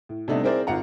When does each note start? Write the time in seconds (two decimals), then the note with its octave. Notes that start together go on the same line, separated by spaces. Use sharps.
0.09 A2
0.28 C3 G3 A3 B3 D4 D#4
0.44 C4 E4 G#4 A#4 C5 D5
0.67 G#1 F4 F#5 A#5